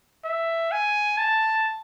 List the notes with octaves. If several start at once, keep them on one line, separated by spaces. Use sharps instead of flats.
E5
G#5
A5